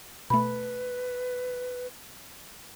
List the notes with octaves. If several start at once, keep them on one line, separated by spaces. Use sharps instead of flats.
B2 A3 B4 B5